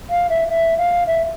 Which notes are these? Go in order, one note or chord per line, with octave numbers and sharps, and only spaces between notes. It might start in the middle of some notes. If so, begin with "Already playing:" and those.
F5
E5
E5
F5
E5